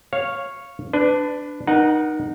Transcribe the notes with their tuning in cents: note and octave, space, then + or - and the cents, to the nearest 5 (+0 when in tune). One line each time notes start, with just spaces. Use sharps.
C#5 -10 F5 +0
D4 +0 B4 +25
D#4 -15 A#4 +35 F#5 +0